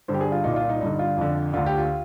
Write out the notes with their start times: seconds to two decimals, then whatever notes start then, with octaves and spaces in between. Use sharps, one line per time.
0.08 G2 D3 C5
0.14 G4
0.21 G#4
0.32 F4
0.44 C2 A#2 D#4
0.56 F4
0.69 D#4
0.81 G2 D3 D#4
0.99 F4
1.17 F2 D3
1.54 D2 D3 F4
1.66 G4
1.78 F4